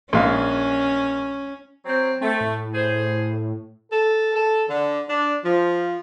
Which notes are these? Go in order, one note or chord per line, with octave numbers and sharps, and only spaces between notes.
A#1 G#3 C#4 F5
F#3 C4
A3 C4
A2
G#4 C5
A4
A4
D3
D4
F3